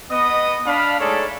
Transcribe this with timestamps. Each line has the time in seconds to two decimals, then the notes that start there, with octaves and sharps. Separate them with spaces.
0.11 B3 D#5 D#6
0.66 D4 F5 B5
1.00 G#3 A3 D#4 A4 C#5 D5